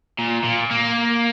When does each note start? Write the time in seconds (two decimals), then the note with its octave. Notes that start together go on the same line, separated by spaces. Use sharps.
0.18 A#2
0.44 A#2
0.71 A#3